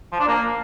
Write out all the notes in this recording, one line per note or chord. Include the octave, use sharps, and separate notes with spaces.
F3
D4
A#3